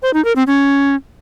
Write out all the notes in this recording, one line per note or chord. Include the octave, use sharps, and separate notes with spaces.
C5
D#4
A#4
C4
C#4